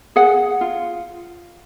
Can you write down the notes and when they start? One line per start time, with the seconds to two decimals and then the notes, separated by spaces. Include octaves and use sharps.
0.16 G#4 F#5
0.61 F4